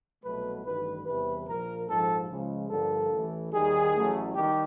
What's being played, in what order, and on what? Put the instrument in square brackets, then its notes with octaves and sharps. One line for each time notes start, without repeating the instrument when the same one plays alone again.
[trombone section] C2 B2 F#3 A3 B4
A1 G2 D#3 B4
E2 C3 E3 G3 B4
A#1 A#2 F3 A#4
A#1 G#2 F3 A4
C#2 C#3 F3 G#3
G2 D3 F3 A#3 A4
A1 A2 E3
D#2 D#3 G3 G#4
A1 A2 F#3 A3
D#3 G3 G4